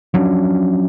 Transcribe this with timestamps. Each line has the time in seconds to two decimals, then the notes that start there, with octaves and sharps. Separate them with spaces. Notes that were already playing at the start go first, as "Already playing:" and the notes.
0.14 F3 F#3 C#4 D4